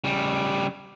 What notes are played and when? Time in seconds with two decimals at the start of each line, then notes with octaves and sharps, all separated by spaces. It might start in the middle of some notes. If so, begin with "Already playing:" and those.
0.04 C#3 G3